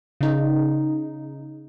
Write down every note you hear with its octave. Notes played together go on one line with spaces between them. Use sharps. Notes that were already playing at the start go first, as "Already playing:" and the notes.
C#3 D#4